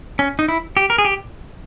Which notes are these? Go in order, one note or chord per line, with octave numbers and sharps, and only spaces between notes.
C#4
D#4
E4
G4
A#4
G#4
G4